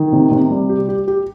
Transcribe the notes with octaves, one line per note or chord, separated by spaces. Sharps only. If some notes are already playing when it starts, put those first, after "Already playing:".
Already playing: D#3
C3
C3
G3
G4
G4
G4